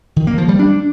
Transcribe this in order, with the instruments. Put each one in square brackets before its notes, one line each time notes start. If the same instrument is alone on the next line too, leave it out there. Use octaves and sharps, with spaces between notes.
[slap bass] D#3
A#3
F3
G3
D4